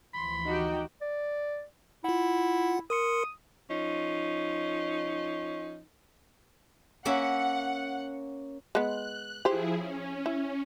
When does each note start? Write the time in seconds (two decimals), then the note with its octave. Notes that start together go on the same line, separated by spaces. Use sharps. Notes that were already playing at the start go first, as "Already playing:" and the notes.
0.14 D2 E3 F3 B5 C6
0.46 D#4 F#4 G4 G5
1.01 D5
2.04 E4 F4 F#5
2.90 A#4 C6 D#6 C#7
3.70 F3 C#4 D#4
7.05 A#3 C#4 E5 F#5
8.75 G#3 B3 F#6
9.45 F3 E4 G4 G#4 C5
9.77 C#4
10.26 E4